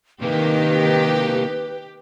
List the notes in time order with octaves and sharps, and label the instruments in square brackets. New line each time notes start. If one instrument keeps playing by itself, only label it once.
[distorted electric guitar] C3 A#3 [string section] D#3 [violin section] G4 [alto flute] B4